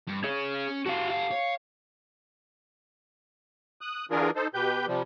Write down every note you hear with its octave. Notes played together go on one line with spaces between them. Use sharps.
G2
C#4 G#4 C#5
F#4 G4 A4 F5
F5
C#5
D#6 F#6
D3 E3 D4 F4 G#4 A#4
D#4 A4 C5
B2 G4 B4 G6
C3 F3 G3